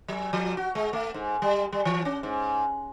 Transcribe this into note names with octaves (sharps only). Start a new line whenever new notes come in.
F#3
F3
F#4
G#3
A3
G#2
G3
G3
E3
C#4
G#2